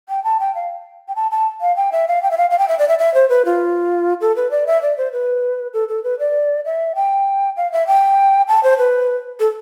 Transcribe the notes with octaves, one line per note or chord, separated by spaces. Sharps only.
G5
A5
G5
F5
G5
A5
A5
F5
G5
E5
F5
G5
E5
F5
F5
G5
E5
D5
E5
E5
C5
B4
F4
A4
B4
D5
E5
D5
C5
B4
A4
A4
B4
D5
E5
G5
F5
E5
G5
A5
C5
B4
A4